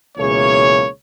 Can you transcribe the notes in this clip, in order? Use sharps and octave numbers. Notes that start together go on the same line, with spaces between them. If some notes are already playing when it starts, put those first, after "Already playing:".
C#2 B2 E3 A#3 G#4 C#5